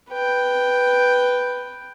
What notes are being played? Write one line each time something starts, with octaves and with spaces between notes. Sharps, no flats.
B4 G5